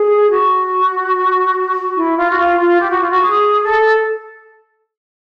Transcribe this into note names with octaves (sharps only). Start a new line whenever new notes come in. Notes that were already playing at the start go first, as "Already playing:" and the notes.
Already playing: G#4
F#4
E4
F4
F#4
F4
F4
G4
F#4
F4
F#4
G#4
A4